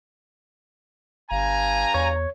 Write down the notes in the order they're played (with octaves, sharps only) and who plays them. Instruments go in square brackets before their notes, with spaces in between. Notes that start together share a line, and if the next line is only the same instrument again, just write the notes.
[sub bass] G1 [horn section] G2 G#5 A#5 [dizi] F5
[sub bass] E2 [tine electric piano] C#5